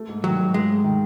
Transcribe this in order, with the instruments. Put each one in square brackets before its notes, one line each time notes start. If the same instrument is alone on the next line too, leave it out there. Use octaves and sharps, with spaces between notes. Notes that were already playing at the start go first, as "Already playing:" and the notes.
Already playing: [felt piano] A3
G#2
[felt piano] D#3 [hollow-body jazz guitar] F#3
[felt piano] G#2
[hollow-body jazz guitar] G#3 [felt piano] A3
[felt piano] G#2
D#3